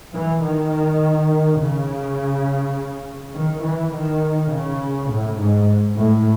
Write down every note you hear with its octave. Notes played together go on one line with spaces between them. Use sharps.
E3
D#3
C#3
D#3
E3
D#3
C#3
A2
G#2
A2